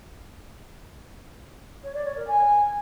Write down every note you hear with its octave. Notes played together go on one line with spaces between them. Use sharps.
C#5
D5
C#5
A#4
G#5